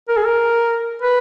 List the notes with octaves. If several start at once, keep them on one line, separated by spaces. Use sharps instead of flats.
A#4
G#4
A#4
B4